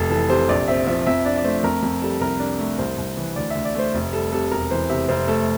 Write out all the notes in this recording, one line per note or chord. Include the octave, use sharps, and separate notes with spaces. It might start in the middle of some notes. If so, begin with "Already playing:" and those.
Already playing: F1 A4
E3 A4
C3 C5
A#1 D5
C4 E5
F3 E5
F2 E5
D4 D5
D5
A3 C5
F2 A#4
F2
G3 A4
C2 A#4
D4
A3
C2 C5
C2
E3
D2 D5
D2 E5
D5
A3 C5
F1
G3 A4
C3 A4
E1 A#4
E3 C5
C3 E5
F1 C5
A3 A4